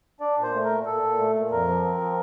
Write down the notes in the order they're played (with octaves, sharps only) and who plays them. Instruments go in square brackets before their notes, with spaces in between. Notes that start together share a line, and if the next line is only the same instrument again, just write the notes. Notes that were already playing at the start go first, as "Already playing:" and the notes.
[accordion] D4 D5
A#2
C5
A3
A#4
A#2
A#2 A4
A#2
A3
A#2
F2 A#4
F3
C4
F3